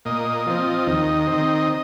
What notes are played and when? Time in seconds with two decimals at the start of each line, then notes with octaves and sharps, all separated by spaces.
0.05 A#2 D#5
0.47 F3 C4
0.87 D#2
1.27 C4
1.32 D#3